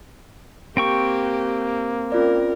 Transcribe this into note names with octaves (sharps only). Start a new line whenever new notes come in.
A#3 C4 G4 G5 C#6
C#4 F4 A#4 D5